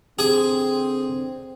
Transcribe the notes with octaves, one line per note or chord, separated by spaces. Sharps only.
D3 C4 G#4